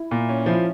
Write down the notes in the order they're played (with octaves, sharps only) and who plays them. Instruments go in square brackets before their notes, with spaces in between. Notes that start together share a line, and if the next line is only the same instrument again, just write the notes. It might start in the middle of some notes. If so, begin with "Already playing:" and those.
Already playing: [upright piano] E4
[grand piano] A#2
C#4
[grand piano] F3 [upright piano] E4